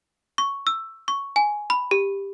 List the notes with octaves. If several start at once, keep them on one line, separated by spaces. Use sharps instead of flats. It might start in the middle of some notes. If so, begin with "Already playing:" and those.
C#6
E6
C#6
G#5
B5
G4